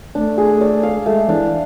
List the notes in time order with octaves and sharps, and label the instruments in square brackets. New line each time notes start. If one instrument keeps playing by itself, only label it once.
[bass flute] A3 [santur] D4
[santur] G#4
D5
F5
[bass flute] G#3 [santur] A3
[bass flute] E3 [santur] D4